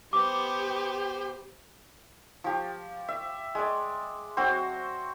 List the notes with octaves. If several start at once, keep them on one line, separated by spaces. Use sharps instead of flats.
B3 G4 C5 D6
F3 G4
E5
G#3 D5
F#3 C4 F#4 C5